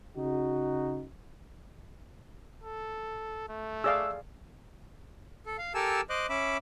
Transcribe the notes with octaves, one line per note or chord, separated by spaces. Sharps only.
C#3 D#4 F#4
A4
A3
G#4 D5 F5 E6
A4
F5
G4 A4 A#4 G#5 A5 E6
C5 D#5 D6 F#6
C#4 E5 B5 D6